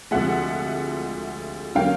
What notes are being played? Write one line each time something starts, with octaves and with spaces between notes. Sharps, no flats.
D2 C3 F3 G#3 E5 F#5
D3 F#3 A#3 C#4 F5 G5